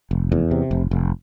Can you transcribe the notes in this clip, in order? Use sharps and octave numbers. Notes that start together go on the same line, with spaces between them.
F1
E2
C3
F1
F1